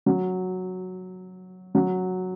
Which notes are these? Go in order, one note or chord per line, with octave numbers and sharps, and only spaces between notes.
F#3
F#3